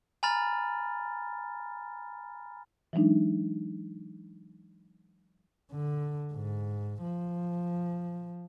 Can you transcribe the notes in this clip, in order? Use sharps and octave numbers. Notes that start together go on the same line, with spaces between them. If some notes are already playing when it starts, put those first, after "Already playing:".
G#5 A#5 B5 F6 A6
E3 F#3 G#3 D4 D#4
D3
G#2
F3